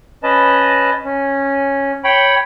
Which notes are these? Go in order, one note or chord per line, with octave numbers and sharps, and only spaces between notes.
C#4 B4 D#5 A5
C#4
C#5 G5 B5